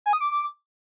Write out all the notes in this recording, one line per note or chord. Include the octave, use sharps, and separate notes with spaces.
G#5
D#6
D6